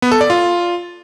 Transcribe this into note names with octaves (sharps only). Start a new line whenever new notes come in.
B3
A4
D5
F4